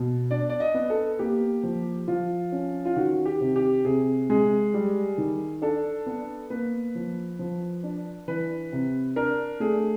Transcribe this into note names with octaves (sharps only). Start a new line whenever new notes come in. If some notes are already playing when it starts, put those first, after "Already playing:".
Already playing: B2
D4 D5
D5
D#5
B3
A4
A#3 G4
F3
F3 F4
C#4
F4
D#3 F#4
G4
C3
G4
C3 G#4
G#3 G#4
G3
D#3
D4 A4
B3
A#3 B4
F3
F3
D4
E3 B4
C3
D4 A#4
A3 G#4